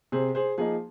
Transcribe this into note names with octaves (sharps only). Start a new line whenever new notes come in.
C3 G#4 C5
G#4 C5
F3 A#3 D#4 G#4